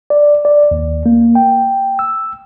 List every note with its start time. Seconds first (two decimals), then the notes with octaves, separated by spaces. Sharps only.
0.10 D5
0.45 D5
0.71 D#2
1.06 A#3
1.35 G5
1.99 E6